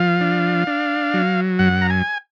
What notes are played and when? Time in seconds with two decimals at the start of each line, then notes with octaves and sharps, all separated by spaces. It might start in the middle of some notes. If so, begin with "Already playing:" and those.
Already playing: F3 F5
0.21 D4
0.67 D4
1.14 F#3
1.59 F#2 F#5
1.82 A#5
1.90 G#5